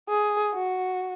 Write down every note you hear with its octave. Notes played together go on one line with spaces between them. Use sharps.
G#4
F#4